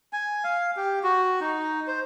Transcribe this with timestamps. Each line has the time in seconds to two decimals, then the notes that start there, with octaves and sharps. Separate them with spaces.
0.13 G#5
0.44 F5
0.76 G4
1.03 F#4
1.41 D#4
1.87 C5